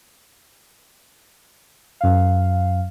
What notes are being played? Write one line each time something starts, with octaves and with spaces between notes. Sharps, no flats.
F#2 F5